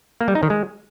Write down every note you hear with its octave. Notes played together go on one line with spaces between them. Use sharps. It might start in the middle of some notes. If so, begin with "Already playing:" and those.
A#3
G3
D#4
D#3
G#3